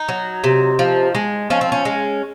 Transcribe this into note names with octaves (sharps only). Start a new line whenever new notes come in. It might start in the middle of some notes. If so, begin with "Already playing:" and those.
Already playing: D#4
F#3
C3
F3
G#3
F3 C#4
C4
C#4
G#3